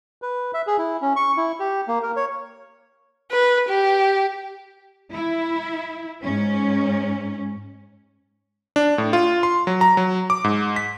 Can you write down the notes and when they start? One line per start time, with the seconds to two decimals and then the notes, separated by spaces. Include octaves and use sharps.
0.22 B4
0.54 E5
0.67 G#4
0.78 E4
1.02 C#4
1.16 C#6
1.37 E4
1.60 G4
1.88 A#3
2.03 A#4
2.16 C#5
3.32 B4
3.69 G4
5.12 E4
6.24 G#2 C#4
8.76 D4
8.98 A2
9.13 F4
9.43 C6
9.67 F#3
9.81 A#5
9.97 F#3
10.30 D6
10.44 G#2
10.76 B6